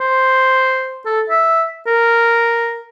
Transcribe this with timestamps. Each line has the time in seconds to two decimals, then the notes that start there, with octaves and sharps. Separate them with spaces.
0.01 C5
1.06 A4
1.30 E5
1.87 A#4